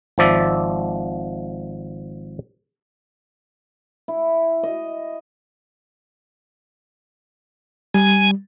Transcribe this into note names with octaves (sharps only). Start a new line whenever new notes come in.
G#1 F3 D5 E5
E4
D#5
G3 G#5